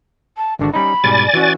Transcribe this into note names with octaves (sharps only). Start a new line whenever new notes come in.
A5
G#1 D3 D4 F#4
G3 C#4 D#4 B5
G#2 B2 G3 D5 G#5 A6
E3 C#4 F#4